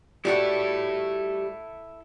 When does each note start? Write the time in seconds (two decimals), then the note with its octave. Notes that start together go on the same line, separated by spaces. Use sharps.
0.25 G3 E4 F#4 A4 F#5